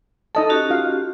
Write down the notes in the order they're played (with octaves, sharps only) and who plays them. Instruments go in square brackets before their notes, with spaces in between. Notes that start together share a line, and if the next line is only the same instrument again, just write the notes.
[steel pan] D#4 D#5 A5 [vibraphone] A4
[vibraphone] C#4 F#4 G4
[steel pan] F4 F5